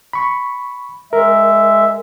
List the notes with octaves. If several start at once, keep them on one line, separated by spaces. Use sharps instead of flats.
B5 C#6
G#3 A#4 E5